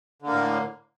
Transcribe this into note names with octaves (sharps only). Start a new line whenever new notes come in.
A2 D3 A#3